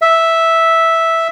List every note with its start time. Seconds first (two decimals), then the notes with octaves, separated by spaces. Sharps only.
0.02 E5